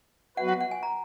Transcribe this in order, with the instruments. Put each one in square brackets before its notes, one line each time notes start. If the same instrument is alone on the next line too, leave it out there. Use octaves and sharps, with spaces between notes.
[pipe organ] F#3 B3 F#4 B4 [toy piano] F#5
[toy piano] F#5
F#5
G#5
A#5